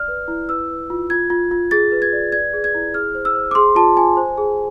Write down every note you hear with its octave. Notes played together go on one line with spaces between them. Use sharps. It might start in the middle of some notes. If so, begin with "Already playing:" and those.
Already playing: D5 F6
B4
E4
B4 E6
B4
F4
F4 G#6
F4
F4
G#4 A6
B4
G#6
D5
D5 G#6
G#4
G#6
E4
G#4 F6
C5
E6
C5
D6
G#4 C6
F4 A5
F4 G#5
C5
G#4